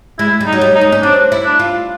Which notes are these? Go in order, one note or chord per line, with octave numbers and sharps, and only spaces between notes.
G#3 E4
G3
D#4
F#3
G3
D#4
G#3
C#4
C4 D4
E4
D4
F4